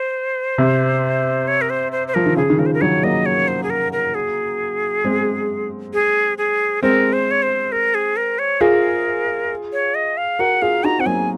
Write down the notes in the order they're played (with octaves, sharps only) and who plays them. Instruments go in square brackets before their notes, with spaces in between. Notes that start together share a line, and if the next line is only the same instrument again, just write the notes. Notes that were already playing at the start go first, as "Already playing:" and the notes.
Already playing: [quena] C5
[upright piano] C3
[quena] C#5
A#4
C5
C5
C5
[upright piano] F3 [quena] A#4
[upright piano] D#3
[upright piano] C#3 [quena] G#4
[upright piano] D#3
[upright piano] C#3 F3 [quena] A#4
[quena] C5
A#4
[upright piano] D#3 F#3 [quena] C#5
[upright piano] F#3 A#3 [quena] D#5
[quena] C#5
C5
G#4
A#4
A#4
G#4
[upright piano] G#3 C4
[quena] G#4
G#4
[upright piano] G#3 C4 [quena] A#4
[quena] C5
C#5
C5
A#4
G#4
A#4
C#5
[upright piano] F4 G#4 [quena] A#4
[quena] C#5
D#5
F5
[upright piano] F#4 A#4 [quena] F#5
[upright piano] F4 G#4 [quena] F5
[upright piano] D#4 F#4 [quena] A#5
[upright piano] C4 [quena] F#5
[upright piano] F#3 A#3 [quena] G#5